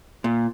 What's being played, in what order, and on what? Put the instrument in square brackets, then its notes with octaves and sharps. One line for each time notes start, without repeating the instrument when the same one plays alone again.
[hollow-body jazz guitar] A#2